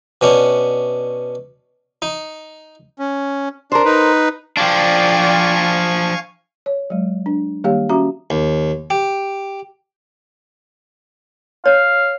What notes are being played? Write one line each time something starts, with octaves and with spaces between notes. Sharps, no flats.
B2 C#4 D4
D#4
C#4
D4 A#4 C5
D#4 B4
F3 D4 D5 F5 G5 G#5 C#6
C#5
F#3 G#3
D4
D#3 G3 A#3 G4 C#5 F5
C#4 F#4 E5 A#5 D6
D#2
G4
C#5 F5